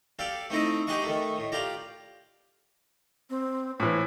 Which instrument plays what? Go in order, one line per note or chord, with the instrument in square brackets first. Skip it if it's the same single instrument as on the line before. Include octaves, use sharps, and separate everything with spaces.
[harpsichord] G4 A4 D5 F5
A3 C4 D#4 E4 D#5
D#4 G4 G#4 D#5 F#5 C#6
D#3 A3
A2
F4 G4 D5 A#5
[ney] C4
[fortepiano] A2 E3 [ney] C5